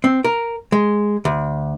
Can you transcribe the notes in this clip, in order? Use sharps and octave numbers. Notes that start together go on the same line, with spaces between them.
C4
A#4
G#3
D2